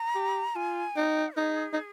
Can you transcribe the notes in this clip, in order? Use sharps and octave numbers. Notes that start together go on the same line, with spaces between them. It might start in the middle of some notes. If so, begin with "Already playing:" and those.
Already playing: A#5
G4
F4 G#5
D#4 G5
D#4 G#4
D#4